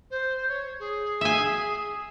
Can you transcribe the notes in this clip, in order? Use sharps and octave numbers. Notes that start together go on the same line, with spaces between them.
C5
C#5
G#4
E5 G#5